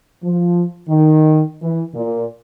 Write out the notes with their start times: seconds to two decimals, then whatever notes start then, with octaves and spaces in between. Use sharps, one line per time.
0.24 F3
0.89 D#3
1.62 E3
1.95 A#2